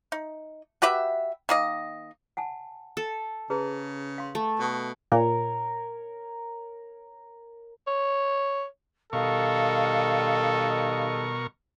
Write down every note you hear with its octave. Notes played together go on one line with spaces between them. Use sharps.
D#4
F#4 G4 B4 E5
D#3 A#3 D#5
F#5 G#5 A5
A4
C#3 G#4 B4 A#5
F5 C6
A3
B2 A4
A#2 A#4 C#5
C#5
B2 D#3 G3 A4 A#4 D#5 F5 C#6